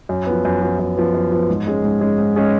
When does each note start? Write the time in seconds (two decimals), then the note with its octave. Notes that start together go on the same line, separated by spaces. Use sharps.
0.09 F#2
0.27 F3 B3
0.45 F#2
0.62 F3 B3
0.79 F#2
0.97 F3 B3
1.14 F#2
1.32 F3 B3
1.49 G#2
1.67 G#3 C#4 G#4
1.84 G#2
2.01 G#3 C#4 G#4
2.18 G#2
2.36 G#3 C#4 G#4